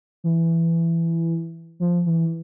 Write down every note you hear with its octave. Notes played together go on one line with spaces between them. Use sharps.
E3
F3
E3